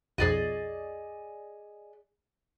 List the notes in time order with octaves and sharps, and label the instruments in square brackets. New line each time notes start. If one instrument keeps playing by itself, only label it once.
[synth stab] B1 F2 [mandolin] G#4 D5 D#5